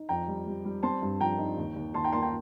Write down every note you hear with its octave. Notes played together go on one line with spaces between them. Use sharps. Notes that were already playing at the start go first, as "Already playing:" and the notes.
Already playing: D#4
F2 G5 A#5
G3
G3
G3
C4 A5 C6
G2
F3 G5 A#5
D#4
D#2
D#2
D#2 A5 C6
G5 A#5
A#3 A5 C6
G5 A#5